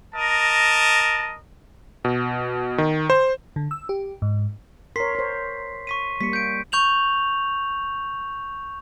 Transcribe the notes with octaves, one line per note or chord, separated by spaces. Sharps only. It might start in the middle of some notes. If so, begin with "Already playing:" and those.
A#4 D#5 A5
B2
D#3
C5
D3
E6
G4
G#2
A#4 C#5 C6 B6 C7
C5 C#5
C#6 B6 D#7
G3 A#3 B6 C#7
G6 D7
C#6 G6 F7 F#7